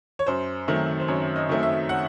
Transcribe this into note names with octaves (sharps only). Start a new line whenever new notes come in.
C#5
F#2 C5
D#3 F#3 A3 C4
C5
F#2 C#5
D#5
D#3 F#3 A3 C4
E5
F#5